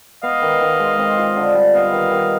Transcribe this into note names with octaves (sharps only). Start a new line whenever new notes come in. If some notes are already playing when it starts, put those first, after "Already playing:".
B3 D#5 F5
D#3
D#3
G#3
C4
F4
D3
G3
B3 D#5 F5
D#3
D#3